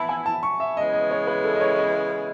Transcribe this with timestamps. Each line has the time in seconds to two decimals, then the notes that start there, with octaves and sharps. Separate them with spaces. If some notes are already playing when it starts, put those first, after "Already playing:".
Already playing: E3 B3 E4 A5 B5
0.09 G#5
0.26 A5
0.43 C#6
0.60 E5
0.76 C#3 E3 G#3 B3 E4 D#5
0.93 D#5
1.11 C#5
1.27 B4
1.44 A4
1.55 D#5
1.61 C#5
1.78 D#5